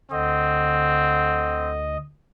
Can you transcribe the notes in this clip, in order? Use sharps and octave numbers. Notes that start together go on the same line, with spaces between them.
D2 D3 C4 D#5